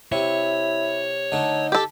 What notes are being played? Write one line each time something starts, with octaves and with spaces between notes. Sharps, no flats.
C3 E4 C#5
D3 A3 D#4
G4 A4